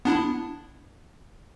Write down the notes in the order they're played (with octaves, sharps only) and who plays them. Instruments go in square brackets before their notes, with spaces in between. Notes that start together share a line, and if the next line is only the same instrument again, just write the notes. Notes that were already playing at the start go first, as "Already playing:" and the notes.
[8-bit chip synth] B3 D4 E4